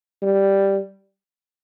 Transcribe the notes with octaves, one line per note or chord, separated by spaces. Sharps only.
G3